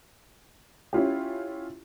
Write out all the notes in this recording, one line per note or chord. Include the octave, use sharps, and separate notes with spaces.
C#4 E4 F4 G4